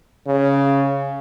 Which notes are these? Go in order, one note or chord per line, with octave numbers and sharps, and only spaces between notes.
C#3